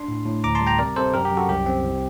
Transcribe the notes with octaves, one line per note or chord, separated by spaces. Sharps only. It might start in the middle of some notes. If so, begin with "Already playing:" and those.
Already playing: D4 C6
A2
A2
D2 A#5 D6
A5 C6
G3
G5 A#5
C3 A#4 D5
C3 A4 C5
F#2 G4 A#4
G4
F#2
F#4 A4
C2 G4
C4
C2